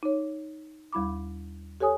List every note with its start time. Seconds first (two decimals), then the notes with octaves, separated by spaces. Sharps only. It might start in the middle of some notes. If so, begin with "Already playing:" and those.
0.03 D#4 C#5
0.93 D#2 G3 E4 B5 D6
1.80 G4 A4 C#5 G#5 D#6